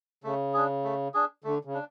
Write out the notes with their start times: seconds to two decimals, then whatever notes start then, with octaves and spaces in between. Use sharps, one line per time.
0.24 C#3 A3
0.54 D4 G#4
0.84 A3
1.14 D4 G#4
1.44 D3 A3
1.65 C#3
1.74 D4